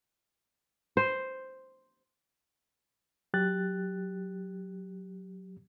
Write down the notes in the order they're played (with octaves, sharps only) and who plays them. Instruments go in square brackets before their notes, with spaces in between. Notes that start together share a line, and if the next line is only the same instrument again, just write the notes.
[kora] C5
[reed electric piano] F#3 G4 F#6 A6